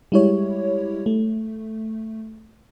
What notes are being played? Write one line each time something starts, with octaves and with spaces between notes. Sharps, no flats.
G3 G#3 E4 G4 C#5
A3